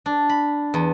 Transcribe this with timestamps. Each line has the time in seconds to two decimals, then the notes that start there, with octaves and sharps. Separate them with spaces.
0.06 D4
0.29 B5
0.74 E2